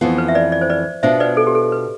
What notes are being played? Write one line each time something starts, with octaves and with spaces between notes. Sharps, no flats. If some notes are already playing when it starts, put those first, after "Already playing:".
F2 E3 B3 F4
B4
E5
B4 D5
D5
C5
B4 D5
B2 B3 D4 F4 C5 E5
B4 D5
A4
G4
A4
B4